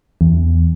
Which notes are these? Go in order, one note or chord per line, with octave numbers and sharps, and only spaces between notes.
E2